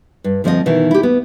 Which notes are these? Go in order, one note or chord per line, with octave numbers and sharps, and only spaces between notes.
G2
D2 F3 C4 C#5 D#5
B2 D#3 E3
E4 G4
B3